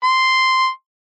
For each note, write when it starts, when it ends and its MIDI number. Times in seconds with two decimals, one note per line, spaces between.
0.03 0.69 84